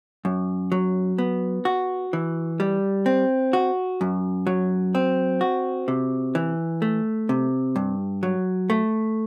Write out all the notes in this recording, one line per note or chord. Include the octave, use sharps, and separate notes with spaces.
F#2
F#3
B3
F#4
E3
G3
C4
F#4
F#2
F#3
C4
F#4
C3
E3
A3
C3
G2
F#3
A3